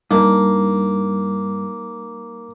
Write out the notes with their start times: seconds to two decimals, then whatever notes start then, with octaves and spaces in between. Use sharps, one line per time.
0.11 G2 G3 A#3 D#4